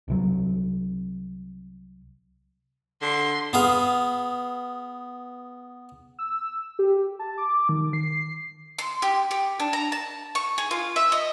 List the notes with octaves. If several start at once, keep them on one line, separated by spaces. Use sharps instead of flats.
C2 C3 F#3
D3 C6
B3 G#4 F5
E6
G4
A5
D6
D#3
C7
C6
G4
G4
D4
A#5
A5
C#6
G#4
F4
E5
D#5